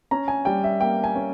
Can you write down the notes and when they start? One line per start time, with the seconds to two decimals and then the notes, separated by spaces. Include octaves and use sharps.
0.11 C#4 A#5
0.28 G#5
0.45 G3 G5
0.64 E5
0.80 A#3 G5
1.04 G#5
1.15 C#4